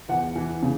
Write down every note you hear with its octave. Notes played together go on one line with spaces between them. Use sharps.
E2 F#5
E3
C#3